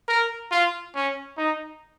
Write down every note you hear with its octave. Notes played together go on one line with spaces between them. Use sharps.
A#4
F4
C#4
D#4